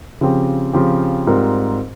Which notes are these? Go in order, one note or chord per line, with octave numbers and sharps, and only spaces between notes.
C#3 F3 C4 G4
C#3 F3 C4 G4
G#2 G3 C4 F4 A#4